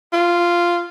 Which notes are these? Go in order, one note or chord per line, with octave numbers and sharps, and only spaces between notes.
F4